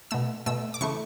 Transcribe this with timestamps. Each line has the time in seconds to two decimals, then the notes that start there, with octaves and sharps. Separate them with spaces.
0.11 B2 A3 E6
0.46 B2 A3 E6
0.74 D6
0.81 C#3 E3 A3 C#6